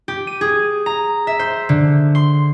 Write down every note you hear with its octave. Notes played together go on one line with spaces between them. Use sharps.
G4
D#7
G#4
A#5
E5
C5
D3
C6